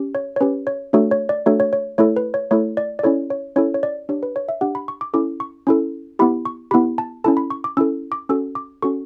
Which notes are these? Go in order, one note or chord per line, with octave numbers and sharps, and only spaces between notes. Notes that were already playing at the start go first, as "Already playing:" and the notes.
Already playing: C#4 G4
C#5
C#5
C#4 G4 B4
C#5
A3 D4 F#4 A4 C#5
C#5
D5
A3 D4 F#4 A4 C#5
C#5
C#5
A3 E4 A4 C#5
B4
C#5
A3 E4 A4 C#5
D5
D5
C#4 E4 A4 C#5
C#5
C#4 E4 A4 C#5
C#5
D5
D4 G4 C#5
B4
C#5
E5
D4 G4 F#5
B5
C#6
D6
C#4 E4 A4 D6
C#6
C#4 E4 A4
B3 E4 G4 B5
C#6
B3 E4 G4 B5
A5
C#4 E4 A4 A5
B5
C#6
D6
C#4 E4 A4 E6
D6
C#4 F#4 A4 E6
D6
C#4 F#4 A4 C#6